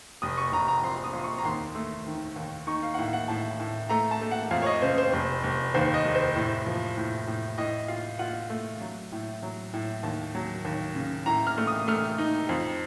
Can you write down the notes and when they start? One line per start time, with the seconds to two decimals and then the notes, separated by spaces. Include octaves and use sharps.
0.22 F1 D#6
0.38 C#6
0.52 F1 A#5
0.68 A#5
0.84 F2 C6
1.04 D#6
1.13 F2
1.24 C#6
1.38 A#5
1.45 D#2 C6
1.75 A3
2.07 D#3
2.36 D#2
2.67 D#4 C#6
2.83 F5
2.94 F#5
2.98 A2 F5
3.13 F#5
3.28 A2 A5
3.60 A2
3.90 A3 A#5
4.11 A5
4.21 A3
4.31 F#5
4.51 F2 F5
4.62 C#5
4.66 D#5
4.82 C#3 C5
4.98 C5
5.13 F1
5.44 F1
5.74 D#2 C5
5.94 D#5
6.05 F1
6.15 C5
6.36 A2
6.66 F3
6.97 A2
7.27 A2
7.58 A2 D#5
7.88 F4 F5
8.19 F4 F#5
8.50 A3
8.81 F#3
9.12 A2
9.43 F#3
9.73 A2
10.03 D#2 A5
10.35 F#3
10.65 D#2
10.95 C#3
11.26 A2 A#5
11.47 F6
11.58 A3
11.67 D#6
11.87 A3 F6
12.18 D#4
12.49 F2